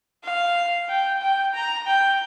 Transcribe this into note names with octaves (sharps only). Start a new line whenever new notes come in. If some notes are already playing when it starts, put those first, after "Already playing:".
F5
G5
G5
A#5
G5